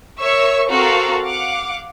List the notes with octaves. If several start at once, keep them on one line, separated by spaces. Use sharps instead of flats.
A#4 C#5 E5 C#6 E6
C4 F#4 A4 A#4 F5 A#5
F5 F#5 D6